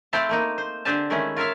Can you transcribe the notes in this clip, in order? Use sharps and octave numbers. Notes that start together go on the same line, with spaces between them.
A3 C4 E4 F5 G5 A5
A3 A#3 D#4
C5
D3 C4 D4 G4 G#5 A5
D#3 G#3 A3 C#4 E4
F4 A#4 C#5 E5 F5